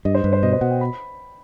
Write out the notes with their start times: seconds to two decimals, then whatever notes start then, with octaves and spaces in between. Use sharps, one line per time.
0.05 G2 D#5
0.15 C5
0.24 G2 B4
0.33 C5
0.43 B2 D#5
0.53 C5
0.61 B2 F#5
0.71 G5
0.81 B5